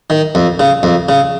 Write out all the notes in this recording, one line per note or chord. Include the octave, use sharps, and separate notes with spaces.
D#3
F2
C#3
F2
C#3